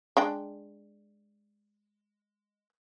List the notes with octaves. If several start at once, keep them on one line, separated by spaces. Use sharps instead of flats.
G#3 D4 G5